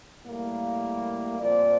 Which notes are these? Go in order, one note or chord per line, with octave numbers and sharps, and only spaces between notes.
A2 G3 A#3
A#2 F3 C4 D5